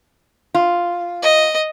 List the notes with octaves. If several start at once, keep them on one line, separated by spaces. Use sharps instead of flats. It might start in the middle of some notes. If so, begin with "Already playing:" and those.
F4
D#5